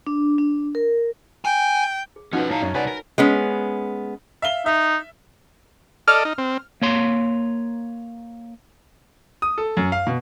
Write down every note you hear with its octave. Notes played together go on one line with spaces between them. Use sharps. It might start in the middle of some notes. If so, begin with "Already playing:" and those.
D4
D4
A#4
G5 G#5
G#4
F3 C#4 D#4 F#4 B4 D#5 F#5
A2 C#5 F5 A5 A#5
F#2 C#4
C2 B4 C#5 D5 F#5 G#5
A#4
G#3 B3 C#4
E5 F5 G7
D#4 E5
A4 D5 D#5 F6
D#4
C4
A#3 C#5 C6
D#6
A4
F#2
F5
B2